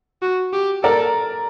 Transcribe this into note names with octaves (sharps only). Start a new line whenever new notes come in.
F#4
G4
A4 A#4 D5